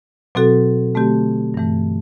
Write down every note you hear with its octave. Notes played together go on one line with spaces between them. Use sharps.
B2 F#3 C4 F#4 A4
D3 A3 C4 G4
G2 E3 A3